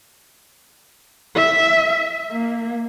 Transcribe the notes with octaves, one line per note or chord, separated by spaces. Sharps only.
E5
A#3